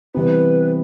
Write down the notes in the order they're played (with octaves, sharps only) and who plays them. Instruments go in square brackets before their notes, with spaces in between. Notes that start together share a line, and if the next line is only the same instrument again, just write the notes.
[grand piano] C3 E3 G3 B3 [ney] B4